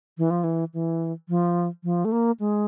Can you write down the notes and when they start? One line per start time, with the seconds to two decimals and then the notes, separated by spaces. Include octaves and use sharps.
0.18 E3
0.30 F3
0.44 E3
0.74 E3
1.29 F3
1.84 F3
2.05 A3
2.12 A#3
2.40 G#3